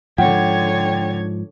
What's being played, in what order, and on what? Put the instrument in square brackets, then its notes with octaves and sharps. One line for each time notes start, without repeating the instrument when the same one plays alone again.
[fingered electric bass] G#2 F3 [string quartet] D3 C#5 G#6 [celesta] F#5 [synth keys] G5